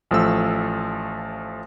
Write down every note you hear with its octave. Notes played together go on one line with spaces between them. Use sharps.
A1 F3 A3 E6